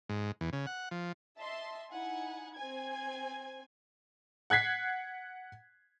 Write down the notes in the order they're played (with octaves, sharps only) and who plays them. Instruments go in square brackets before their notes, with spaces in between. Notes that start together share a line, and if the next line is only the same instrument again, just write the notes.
[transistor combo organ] G#2
E2
C#3
F#5
F3
[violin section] D#5 E5 A5 C6
D#4 E4 F#5 G#5
C4 G#5 G#6
[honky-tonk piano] F#5 F#6 G#6 B6 C7